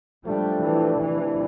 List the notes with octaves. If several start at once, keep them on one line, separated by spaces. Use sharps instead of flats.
F3 G3 A3 D4 G4
E3
C3 E3 F3 A3 D4